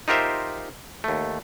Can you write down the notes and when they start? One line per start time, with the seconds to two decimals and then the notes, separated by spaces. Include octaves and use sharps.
0.08 D#4 F4 G4 A#4 C5 E5
1.04 D#2 A3